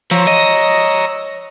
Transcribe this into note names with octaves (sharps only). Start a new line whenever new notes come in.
F3 C#5 A#5 E6
D#5